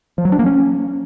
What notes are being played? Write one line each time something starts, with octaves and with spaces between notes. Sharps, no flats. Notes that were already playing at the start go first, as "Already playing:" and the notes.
F3
F#3
D4
A#3
C#4